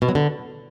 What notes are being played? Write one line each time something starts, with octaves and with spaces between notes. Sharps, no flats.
B2
F#3
D3